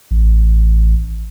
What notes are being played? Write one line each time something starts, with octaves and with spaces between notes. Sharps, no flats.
A1